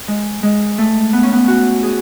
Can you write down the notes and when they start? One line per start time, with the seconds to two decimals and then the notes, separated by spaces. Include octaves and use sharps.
0.08 G#3
0.43 G#3
0.78 A3
1.13 B3
1.23 C#4
1.33 B3
1.48 F#4
1.83 G#4